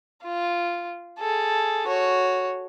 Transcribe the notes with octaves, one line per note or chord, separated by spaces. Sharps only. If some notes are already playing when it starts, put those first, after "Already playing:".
F4
G#4 A4
F#4 C#5